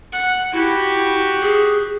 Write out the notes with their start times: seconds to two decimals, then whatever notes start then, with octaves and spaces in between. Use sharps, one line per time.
0.13 F#5
0.53 E4 F#4 G4
1.42 G#4